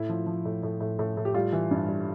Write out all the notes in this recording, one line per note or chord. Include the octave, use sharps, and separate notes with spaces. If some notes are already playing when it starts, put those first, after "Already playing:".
Already playing: A2 E4
F3
F3
A2
A2
A2
A2
A2
G4
G3 F4
E3
G2
G3